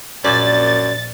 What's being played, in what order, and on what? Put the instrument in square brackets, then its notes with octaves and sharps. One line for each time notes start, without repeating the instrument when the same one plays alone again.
[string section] A#1 A6 [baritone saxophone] F#2 [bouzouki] D5